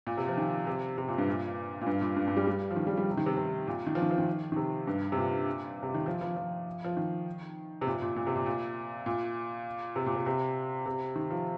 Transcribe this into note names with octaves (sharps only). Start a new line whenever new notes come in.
A#2
C3
F3
D#3
C3
C3
A#2
G2
A#2
A#2
G2
A#2
G2
G2
G3
G3
F3
D#3
G3
G3
C3
D#3
C3
C3
A#2
D#3
F3
D#3
F3
D#3
D#3
C3
G2
C3
A#2
C3
D#3
F3
F3
F3
F3
D#3
C3
A#2
A#2
A#2
C3
A#2
A#2
A#2
C3
A#2
C3
C3
C3
D#3
F3